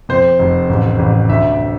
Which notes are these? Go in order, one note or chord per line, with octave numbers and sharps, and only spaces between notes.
F2 C5
F1
A1
A1
D2 E5